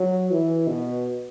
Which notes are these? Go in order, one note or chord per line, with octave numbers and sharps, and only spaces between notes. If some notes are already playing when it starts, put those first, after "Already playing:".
Already playing: F#3
E3
B2